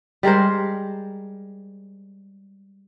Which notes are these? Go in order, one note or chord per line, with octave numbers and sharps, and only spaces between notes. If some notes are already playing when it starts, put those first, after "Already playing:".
G3 G#3 A#4 C5